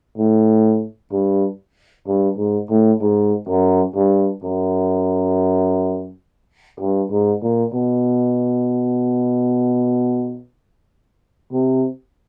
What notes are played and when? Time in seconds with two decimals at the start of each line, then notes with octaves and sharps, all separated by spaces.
0.18 A2
1.12 G2
2.07 G2
2.38 G#2
2.70 A2
3.01 G#2
3.48 F#2
3.96 G2
4.44 F#2
6.80 G2
7.11 G#2
7.43 A#2
7.74 B2
11.53 C3